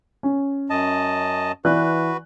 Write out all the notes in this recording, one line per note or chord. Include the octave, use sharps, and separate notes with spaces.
C#4
F#2 D#5 A5
E3 F#4 B4 D5 F#6